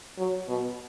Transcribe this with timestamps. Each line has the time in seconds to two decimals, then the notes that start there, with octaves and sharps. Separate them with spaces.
0.18 F#3
0.48 B2